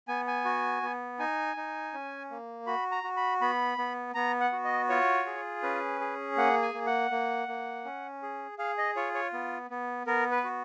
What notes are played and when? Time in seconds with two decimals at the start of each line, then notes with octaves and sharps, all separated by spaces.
0.08 B3 G#5
0.27 G#5
0.45 F#4
0.83 B3
1.19 D#4 G#5
1.57 D#4
1.93 C#4
2.30 A#3
2.67 F#4 B5
2.92 A#5
3.04 F#4
3.17 B5
3.41 B3 B5
3.78 B3
4.15 B3 A#5
4.40 F#5
4.52 F#4
4.65 D#5
4.89 F4 C#5
5.26 G#4
5.63 C#4 B4
6.00 G#4
6.37 A#3 F#5
6.62 G#5
6.74 A#3
6.86 F#5
7.11 A#3
7.48 A#3
7.85 C#4
8.23 G#4
8.59 G#4 F5
8.78 D#5
8.96 F4 C#5
9.15 C#5
9.33 B3
9.70 B3
10.07 B3 A#4
10.31 B4
10.44 F#4